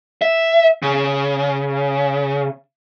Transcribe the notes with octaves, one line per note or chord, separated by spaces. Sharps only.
E5
C#3